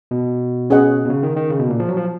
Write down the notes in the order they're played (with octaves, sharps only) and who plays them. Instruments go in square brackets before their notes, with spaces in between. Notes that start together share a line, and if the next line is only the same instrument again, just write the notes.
[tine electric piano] B2
[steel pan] C#4 G#4 B4 D#5 F#5
[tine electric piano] B2
C#3
D#3
D#3
C#3
B2
A#2
F3
F#3
F3